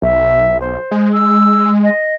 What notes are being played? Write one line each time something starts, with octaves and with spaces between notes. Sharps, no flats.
B1 E5
C5
G#3
E6
D#5